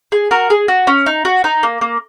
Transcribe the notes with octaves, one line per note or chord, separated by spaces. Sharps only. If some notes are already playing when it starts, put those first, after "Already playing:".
G#4
F#4 A#4
G#4
F#4
C#4
D#4
F#4
D#4
A#3
A#3